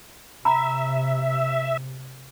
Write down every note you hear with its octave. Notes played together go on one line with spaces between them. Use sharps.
C3 E5 A#5 B5